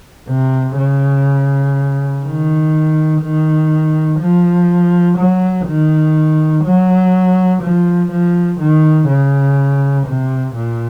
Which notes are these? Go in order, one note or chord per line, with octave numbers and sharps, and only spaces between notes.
C3
C#3
D#3
D#3
F3
F#3
D#3
F#3
F3
F3
D#3
C#3
C3
A#2